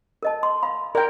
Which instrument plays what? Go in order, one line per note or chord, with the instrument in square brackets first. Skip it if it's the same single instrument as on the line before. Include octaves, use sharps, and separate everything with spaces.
[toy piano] A#4 D#5 A5
C6
F5 B5
[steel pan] A#4 G5 [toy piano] D5